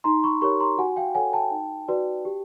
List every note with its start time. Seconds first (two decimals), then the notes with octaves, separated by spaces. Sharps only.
0.04 D#4 A#5 C6
0.24 B5 C#6
0.41 G4 A#4 C#5 B5 C#6
0.60 A#5 C6
0.78 F#4 F#5 G#5
0.97 F5 G5
1.15 A4 C#5 F#5 G#5
1.33 G5 A5
1.51 D#4
1.88 F#4 B4 D5
2.25 G4